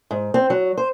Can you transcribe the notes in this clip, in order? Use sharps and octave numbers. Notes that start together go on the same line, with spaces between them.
G#2
C4
F#3
C5